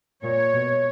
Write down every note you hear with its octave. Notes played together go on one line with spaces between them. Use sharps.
A#2 C#5
B2